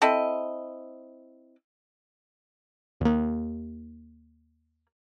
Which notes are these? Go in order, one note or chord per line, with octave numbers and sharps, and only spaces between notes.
C4 E4 A4 D#5
D#2 A#3